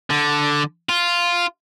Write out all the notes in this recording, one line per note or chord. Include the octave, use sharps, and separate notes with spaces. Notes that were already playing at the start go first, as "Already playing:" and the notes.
D3
F4